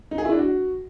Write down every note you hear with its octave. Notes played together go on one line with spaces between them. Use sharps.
D#4
G#4
E4
D4
F#4